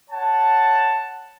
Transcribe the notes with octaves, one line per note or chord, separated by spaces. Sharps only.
C#5 F#5 A5